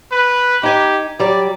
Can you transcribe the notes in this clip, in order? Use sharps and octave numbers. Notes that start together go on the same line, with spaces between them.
B4
D#4 G4 G#5
F#3 G3 D5